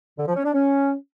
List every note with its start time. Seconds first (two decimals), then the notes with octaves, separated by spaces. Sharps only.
0.18 D3
0.27 F3
0.36 C#4
0.45 D4
0.54 C#4